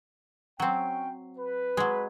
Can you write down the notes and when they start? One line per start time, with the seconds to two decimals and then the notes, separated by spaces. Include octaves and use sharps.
0.60 F#3 C4 C#4 G5
1.39 B4
1.77 F#3 G#3